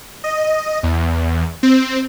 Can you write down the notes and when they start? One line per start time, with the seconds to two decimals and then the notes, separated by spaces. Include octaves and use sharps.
0.24 D#5
0.83 E2
1.63 C4